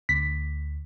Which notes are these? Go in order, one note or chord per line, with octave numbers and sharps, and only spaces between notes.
D2 B6